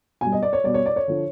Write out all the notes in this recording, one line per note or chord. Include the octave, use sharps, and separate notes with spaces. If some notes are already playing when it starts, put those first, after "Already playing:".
B2 G3 G#5
D#5
D5
C#5
B2 G3 D5
C#5
D5
C#5
D3 F3